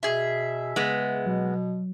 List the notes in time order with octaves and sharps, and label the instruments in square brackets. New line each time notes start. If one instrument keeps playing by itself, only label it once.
[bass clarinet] B2 [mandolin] G#4 E5
[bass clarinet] C#3 [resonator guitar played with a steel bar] G#3 B3
[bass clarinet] B2 [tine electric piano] F#3